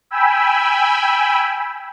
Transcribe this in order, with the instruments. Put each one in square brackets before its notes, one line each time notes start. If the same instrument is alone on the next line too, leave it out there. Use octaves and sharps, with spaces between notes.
[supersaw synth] G5 G#5 B5 E6